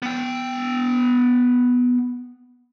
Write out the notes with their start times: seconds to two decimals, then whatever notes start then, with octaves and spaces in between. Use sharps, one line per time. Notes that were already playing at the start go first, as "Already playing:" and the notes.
0.02 B3 G5